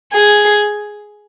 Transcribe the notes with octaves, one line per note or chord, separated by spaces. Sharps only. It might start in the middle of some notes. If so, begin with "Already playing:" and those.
G#4